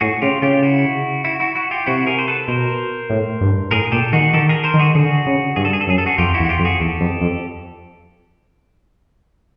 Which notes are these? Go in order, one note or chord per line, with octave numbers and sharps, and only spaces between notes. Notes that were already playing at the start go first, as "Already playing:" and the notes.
A2 F#4 G#4
C#3 F4 G4
C#3 F4 G4
E4 F#4
E4 F#4
E4 F#4
E4 F#4
F4 G4
C3 E4 F#4
G#4 A#4
C5
A4 B4
B2 A#4 C5
A2
G2
A2 G#4 A#4
A#2 G4 A4
D#3 F#4 G#4
D#3 G4 A4
G#4 A#4
A#4 C5
D#3
F#4 G#4
D3 F#4 G#4
C#3
G2 G#4
A4
G#4
A4
F#2 G#4
A4
F#4 G#4
F2 F4 G4
E4 F#4
E2
F#4
F4 G4
F2
F#4 G#4
E2 G4 A4
F2
F2